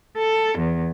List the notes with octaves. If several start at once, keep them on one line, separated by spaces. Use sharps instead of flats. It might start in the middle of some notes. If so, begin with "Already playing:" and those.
A4
E2